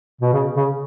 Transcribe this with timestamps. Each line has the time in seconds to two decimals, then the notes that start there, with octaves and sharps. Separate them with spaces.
0.21 B2
0.33 C#3
0.57 C#3